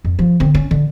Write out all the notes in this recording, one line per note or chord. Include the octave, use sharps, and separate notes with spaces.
F2
F3
D3 C4
C#4
D3